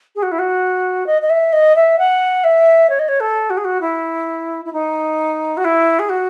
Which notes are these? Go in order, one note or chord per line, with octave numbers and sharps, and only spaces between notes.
G#4
F#4
E4
F#4
D#5
D#5
E5
D#5
E5
F#5
E5
C#5
D#5
C#5
A4
F#4
G#4
F#4
E4
E4
D#4
F#4
E4
G#4
F#4